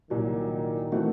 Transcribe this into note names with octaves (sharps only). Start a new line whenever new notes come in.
C2 A#2 D#3 F#3
E3 A3 C4 D#4 F#4